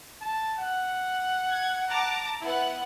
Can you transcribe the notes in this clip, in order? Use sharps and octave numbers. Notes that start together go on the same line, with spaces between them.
A5
F#5
G#6
A5 A#5 D6
B3 E4 F#5